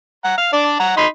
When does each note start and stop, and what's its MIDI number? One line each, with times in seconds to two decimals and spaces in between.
0.24 0.36 78
0.24 0.36 82
0.38 0.48 77
0.53 0.76 62
0.53 0.76 74
0.80 0.95 78
0.80 0.95 82
0.97 1.07 63
0.97 1.07 83
0.97 1.07 84